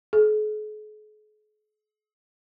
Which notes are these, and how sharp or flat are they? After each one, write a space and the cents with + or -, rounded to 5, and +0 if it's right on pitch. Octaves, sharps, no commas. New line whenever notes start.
G#4 +45